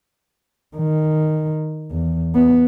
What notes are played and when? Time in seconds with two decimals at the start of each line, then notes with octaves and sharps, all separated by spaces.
0.77 D#3
1.91 E2
2.35 B3